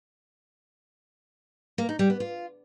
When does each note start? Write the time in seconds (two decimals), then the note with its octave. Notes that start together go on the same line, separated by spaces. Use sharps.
1.78 A#3
1.89 D#4
1.99 G3
2.10 B3
2.20 F4